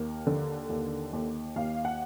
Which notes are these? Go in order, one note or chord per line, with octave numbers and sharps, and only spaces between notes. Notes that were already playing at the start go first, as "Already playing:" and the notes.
Already playing: D#2 A#4
D3
D#2
D#2
D#2 F5
F#5